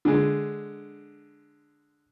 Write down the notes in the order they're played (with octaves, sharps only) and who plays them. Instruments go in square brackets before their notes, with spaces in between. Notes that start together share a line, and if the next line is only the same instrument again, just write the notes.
[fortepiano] D3 G#3